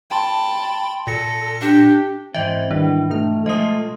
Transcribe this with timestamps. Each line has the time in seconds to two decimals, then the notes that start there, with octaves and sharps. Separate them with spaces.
0.11 G5 A5 B5 C6
1.07 A#2 A4 A#6 C#7
1.61 D4 G4
2.34 G#2 E3 C4 D#5 E5 G5
2.71 D#3 G3 D4 E4 B4
3.10 B2 A3 D#4 F6
3.46 B2 F3 G#3 A3 F4 D#5 D#6